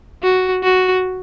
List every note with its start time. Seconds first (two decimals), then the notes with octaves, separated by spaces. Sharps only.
0.23 F#4
0.63 F#4